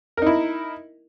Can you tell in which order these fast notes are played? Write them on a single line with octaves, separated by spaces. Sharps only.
A#4 D#4 E4